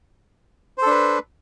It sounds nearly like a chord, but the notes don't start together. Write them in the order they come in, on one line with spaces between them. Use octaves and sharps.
C5 A4 D4 B4